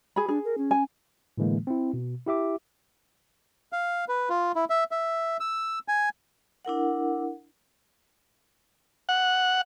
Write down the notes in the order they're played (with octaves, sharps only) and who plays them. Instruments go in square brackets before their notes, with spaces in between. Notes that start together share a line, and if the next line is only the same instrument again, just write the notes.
[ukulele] G#4 B5
[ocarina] D4 [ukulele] G#4
[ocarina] A#4
C#4
[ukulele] G#5
[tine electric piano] A2 D3 E3 G#3 A#3
C4 E4
B2
E4 G4 E5 D6
[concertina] F5
B4
F4
E4
E5
E5
E6
G#5
[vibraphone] D4 E4 A#4 F#5
[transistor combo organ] F#5